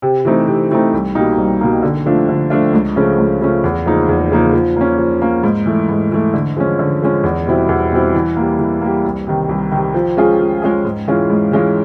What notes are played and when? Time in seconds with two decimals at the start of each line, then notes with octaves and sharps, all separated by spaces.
0.02 C3
0.25 E3 A3 C4 D#4
0.47 C3
0.71 E3 A3 C4 D#4
0.93 C2
1.15 B2 G3 A#3 D#4
1.38 C2
1.61 B2 G3 A#3 D#4
1.82 D3
2.06 F3 A3 D4 F4
2.29 D3
2.50 F3 A3 D4 F4
2.73 C#2
2.96 C#3 F3 A3 C#4
3.18 C#2
3.41 C#3 F3 A3 C#4
3.64 E2
3.86 C#3 F3 A#3 D#4
4.09 E2
4.31 C#3 F3 A#3 D#4
4.53 F3
4.76 A#3 C#4
4.98 F3
5.22 A#3 C#4
5.43 G#2
5.66 E3 A3
5.89 G#2
6.12 E3 A3
6.34 D3
6.57 F3 G#3 C#4
6.79 D3
7.02 F3 G#3 C#4
7.23 E2
7.47 B2 G3 C4 E4
7.69 E2
7.92 B2 G3 C4 E4
8.15 E3
8.37 G3 A#3
8.59 E3
8.81 G3 A#3
9.05 C2
9.27 C3 D#3
9.49 C2
9.72 C3 D#3
9.94 F3
10.17 G#3 C#4 F4 G#4
10.40 F3
10.62 G#3 C#4 F4 G#4
10.85 G#2
11.08 E3 G#3 C#4 F4
11.30 G#2
11.52 E3 G#3 C#4 F4